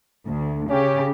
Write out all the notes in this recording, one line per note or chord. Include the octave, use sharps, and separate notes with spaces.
D2
C#3 C#4 G4